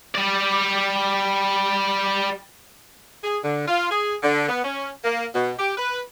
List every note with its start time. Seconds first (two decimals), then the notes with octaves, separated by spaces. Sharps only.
0.15 G3 D5
3.24 G#4
3.44 D3
3.67 F4
3.91 G#4
4.23 D3
4.49 B3
4.64 C#4
5.04 A#3
5.34 B2
5.59 G4
5.77 B4